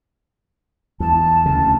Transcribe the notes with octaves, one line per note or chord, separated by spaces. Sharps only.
E2 A5
D2 C#3